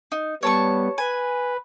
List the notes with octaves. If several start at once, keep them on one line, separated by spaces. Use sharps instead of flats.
D#4
G3 B3 C#5 A5 C#6
B4 G#5